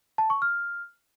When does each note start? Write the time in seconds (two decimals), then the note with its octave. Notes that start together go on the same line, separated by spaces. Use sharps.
0.18 A5
0.30 C#6
0.42 F6